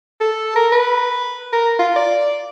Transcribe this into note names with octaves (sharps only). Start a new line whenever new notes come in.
A4
A#4
B4
A#4
F4
D5